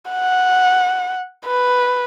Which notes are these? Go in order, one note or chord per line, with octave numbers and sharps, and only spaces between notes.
F#5
B4